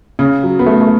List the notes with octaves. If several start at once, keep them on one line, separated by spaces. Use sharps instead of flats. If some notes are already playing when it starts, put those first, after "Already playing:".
C#3
F#3
B3
A3
A3